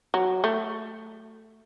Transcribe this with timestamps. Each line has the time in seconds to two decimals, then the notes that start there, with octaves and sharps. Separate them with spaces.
0.14 F#3
0.44 A3